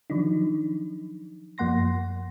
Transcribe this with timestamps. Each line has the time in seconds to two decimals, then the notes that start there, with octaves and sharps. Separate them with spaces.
0.10 D#3 F3 F#3 D4 D#4
1.58 F#2 F3 A#3 F#5 C6 A#6